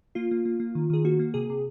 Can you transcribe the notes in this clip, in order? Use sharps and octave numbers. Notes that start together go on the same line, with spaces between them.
A#3 F4
A#3
A#3
A#3
D#3
D#3 G#4
A#3 F#4
A#3
C3 G#4
C3